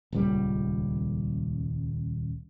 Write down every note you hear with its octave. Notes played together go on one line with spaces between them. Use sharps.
D#1 C#2 G3